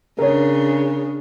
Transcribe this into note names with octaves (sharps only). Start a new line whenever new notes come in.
C#3 D4 A#4 C#5